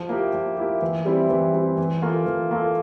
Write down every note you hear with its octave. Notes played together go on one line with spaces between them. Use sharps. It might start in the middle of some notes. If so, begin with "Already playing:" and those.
Already playing: F3
A#3 E4 G4
F3
A#3 E4 G4
E3
G3 C4 E4
E3
G3 C4 E4
E3
A#3 F4 A4
E3
A#3 F4 A4